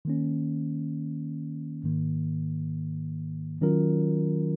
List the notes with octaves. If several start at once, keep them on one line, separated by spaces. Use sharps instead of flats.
D#3 A#3 C#4
G#2 D#3 A#3
D#3 F#3 C#4 F4 A#4